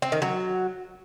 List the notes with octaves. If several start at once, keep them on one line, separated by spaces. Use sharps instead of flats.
C4
D#3
F#3